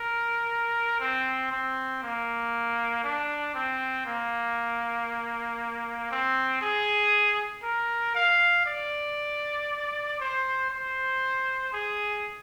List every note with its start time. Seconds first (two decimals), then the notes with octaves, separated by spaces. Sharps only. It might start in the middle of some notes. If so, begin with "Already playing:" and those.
Already playing: A#4
1.00 C4
1.51 C4
2.03 A#3
3.04 D4
3.55 C4
4.06 A#3
6.11 C4
6.62 G#4
7.64 A#4
8.15 F5
8.66 D5
10.20 C5
10.70 C5
11.73 G#4